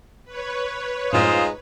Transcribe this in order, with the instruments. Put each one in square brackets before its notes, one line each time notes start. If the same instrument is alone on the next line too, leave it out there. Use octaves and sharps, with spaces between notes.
[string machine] B4 C#5
[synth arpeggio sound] F#2 A2 [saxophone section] G#3 D#4 F4 [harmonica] C5 F5 D#6